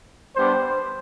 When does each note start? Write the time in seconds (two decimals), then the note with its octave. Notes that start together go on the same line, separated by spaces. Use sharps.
0.35 G3 B3 D4 G4 C5